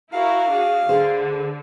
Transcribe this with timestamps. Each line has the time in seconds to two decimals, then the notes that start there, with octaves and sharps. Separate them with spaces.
0.13 E4 F#4 A#4 F5
0.50 D4 F#4 G#4
0.89 D2 D3 G#4 C5